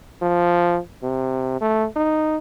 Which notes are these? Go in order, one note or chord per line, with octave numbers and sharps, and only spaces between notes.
F3
C3
A3
D#4